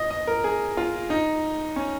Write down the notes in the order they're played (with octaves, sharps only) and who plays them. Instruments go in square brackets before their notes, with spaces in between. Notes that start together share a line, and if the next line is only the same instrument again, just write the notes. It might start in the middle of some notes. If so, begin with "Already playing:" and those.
Already playing: [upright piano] D#5
D#5
A#4
G#4
F4
D#4
C#4